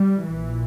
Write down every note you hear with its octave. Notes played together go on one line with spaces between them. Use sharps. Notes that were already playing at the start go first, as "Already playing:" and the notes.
Already playing: G3
A#1 A#2 E3